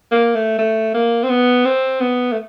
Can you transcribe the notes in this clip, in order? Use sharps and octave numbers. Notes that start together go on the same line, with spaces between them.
A#3
A3
A3
A#3
C4
B3
C4
B3
A3